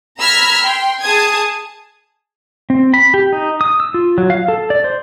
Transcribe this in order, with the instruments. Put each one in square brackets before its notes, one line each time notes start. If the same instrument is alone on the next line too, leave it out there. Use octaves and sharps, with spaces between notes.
[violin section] A#5 B5 E6 F6 G#6 B6
G5 C6
G#4 A5 D#6 G#6
[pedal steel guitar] C4
B5
G4
D#4
D#6
E6
F4
F#3
F5
A4
D5
C5